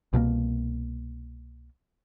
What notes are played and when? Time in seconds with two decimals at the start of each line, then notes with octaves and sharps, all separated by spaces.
0.13 C2 B2 G#3 A#3